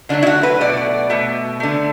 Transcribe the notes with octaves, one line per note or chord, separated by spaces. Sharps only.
D3 F#3 A3 D4
E4
F#4
B4
B2 F#3 A3 D5
B2 A3
D3 A3